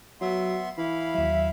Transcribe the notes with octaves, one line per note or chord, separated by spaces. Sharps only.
F#3 B3 E5 C6
E3 E4 F5 B5
D#2 F#3 E5